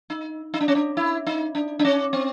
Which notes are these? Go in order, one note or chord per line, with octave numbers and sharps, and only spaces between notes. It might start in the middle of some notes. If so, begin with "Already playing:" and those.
D#4
D#4
D4
C#4
D4
E4
D#4
D4
D4
C#4
C4